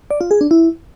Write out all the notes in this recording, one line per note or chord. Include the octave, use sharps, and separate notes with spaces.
D5
F4
G#4
D4
E4